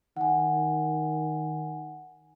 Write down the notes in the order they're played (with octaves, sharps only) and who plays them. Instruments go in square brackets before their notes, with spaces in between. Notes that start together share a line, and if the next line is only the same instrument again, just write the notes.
[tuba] D#3 [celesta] F#5 G#5